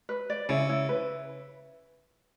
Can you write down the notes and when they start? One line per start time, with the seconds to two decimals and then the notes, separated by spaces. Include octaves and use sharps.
0.09 B4
0.30 D5
0.49 C#3 E4
0.69 E4
0.89 B4